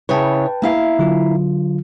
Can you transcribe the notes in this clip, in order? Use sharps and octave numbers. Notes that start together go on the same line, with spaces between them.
C#3 E4 B4 C#5 G5 A5
A#3 E4 F5
D3 F#3 F4